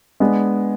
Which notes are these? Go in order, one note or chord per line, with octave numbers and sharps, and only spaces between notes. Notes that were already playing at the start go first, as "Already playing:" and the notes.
G#3 B3 D4